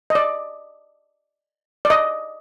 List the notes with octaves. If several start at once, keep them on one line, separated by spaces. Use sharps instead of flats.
D#5
D5
D5
D#5